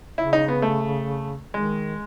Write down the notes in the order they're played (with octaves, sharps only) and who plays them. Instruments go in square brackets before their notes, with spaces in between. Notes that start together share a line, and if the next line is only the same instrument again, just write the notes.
[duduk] C#3 [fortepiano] E4
[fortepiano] D#4
B3
A3
[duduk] D#3 [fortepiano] G#3